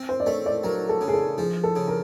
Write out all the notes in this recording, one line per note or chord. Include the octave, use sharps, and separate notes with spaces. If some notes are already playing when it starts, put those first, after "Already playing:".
Already playing: C4
C5
D5
A3 C#5
D5
F#3 A#4
A4
C#3
G#4
A4
F3 G#4
A4
C#3
A#4